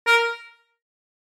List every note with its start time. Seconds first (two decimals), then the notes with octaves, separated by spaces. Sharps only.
0.07 A#4